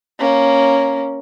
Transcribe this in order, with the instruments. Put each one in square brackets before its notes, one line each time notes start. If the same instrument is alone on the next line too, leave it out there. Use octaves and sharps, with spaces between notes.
[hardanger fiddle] A#3 C#4